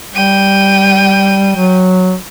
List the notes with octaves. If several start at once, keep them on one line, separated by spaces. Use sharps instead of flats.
G3 G5 D#7
F#3